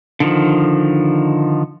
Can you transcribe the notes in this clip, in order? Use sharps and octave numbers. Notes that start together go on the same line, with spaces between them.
D3 D#3 F3